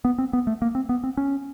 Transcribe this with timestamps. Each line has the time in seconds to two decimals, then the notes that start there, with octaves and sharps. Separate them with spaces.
0.05 B3
0.18 C4
0.33 B3
0.47 A3
0.62 A#3
0.75 C4
0.89 B3
1.04 C4
1.17 C#4